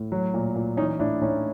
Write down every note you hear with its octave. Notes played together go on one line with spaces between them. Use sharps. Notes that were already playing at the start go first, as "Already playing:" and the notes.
Already playing: A2
F#3
A#2
A#2
E3 C#4 D#4
A2 D4 E4
A2 C#4 D#4